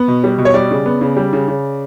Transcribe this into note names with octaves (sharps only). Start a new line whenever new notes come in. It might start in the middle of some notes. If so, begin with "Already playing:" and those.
Already playing: B3
B2
G3
B2
C#5
G3 D5
C#3
B3
C#3
G3
C#3
C#3